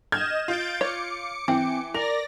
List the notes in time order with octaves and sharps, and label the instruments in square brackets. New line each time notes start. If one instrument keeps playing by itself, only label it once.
[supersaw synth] D#5 E7 [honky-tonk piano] F6 G6 G#6
[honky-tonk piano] F4 [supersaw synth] G6 A6 D7
[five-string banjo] C#5 [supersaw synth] D6 C#7
[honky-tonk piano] E3 [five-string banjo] C4
[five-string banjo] A#4 [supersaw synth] D5 A#6 [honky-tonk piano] F7